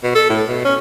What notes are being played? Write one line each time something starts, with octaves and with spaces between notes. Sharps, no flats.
B2
A4
A2
B2
C#4